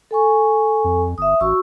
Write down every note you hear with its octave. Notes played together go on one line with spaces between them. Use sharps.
A4 G#5 C#6
F2
G1 E5 D#6
A1 F#4 C#6 E6